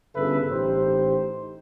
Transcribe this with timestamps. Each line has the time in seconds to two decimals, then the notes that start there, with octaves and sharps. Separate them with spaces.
0.15 G1 C#3 A4 B4 E5
0.50 A1 D#4 G4 C5